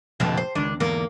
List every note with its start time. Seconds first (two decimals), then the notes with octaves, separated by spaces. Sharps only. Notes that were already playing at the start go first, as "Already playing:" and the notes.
0.20 F1 A#1 F2 B2 D3
0.37 C5
0.55 C#2 D#3 D4
0.80 E2 G#2 D3 A#3